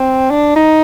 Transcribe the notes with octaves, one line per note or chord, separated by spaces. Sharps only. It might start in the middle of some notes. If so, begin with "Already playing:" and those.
Already playing: C4
D4
D#4